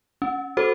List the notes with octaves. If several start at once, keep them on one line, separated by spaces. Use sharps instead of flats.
C#4
F#4 A4 C5